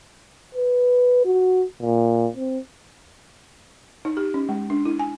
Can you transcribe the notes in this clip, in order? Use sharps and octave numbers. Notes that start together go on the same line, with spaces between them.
B4
F#4
A#2
C4
D#4
G4
C#4
G#3
D4
E4
G#5